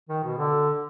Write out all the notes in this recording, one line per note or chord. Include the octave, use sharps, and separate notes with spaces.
D#3
B2
D3